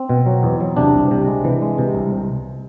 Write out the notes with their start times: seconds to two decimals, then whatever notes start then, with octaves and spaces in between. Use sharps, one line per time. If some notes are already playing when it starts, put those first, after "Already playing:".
Already playing: C4
0.09 B2
0.26 F#3
0.43 E2
0.60 F#3
0.77 C3 D4
0.94 C2
1.11 C3
1.28 G#3
1.44 E3
1.62 G#3
1.78 C3
1.95 C2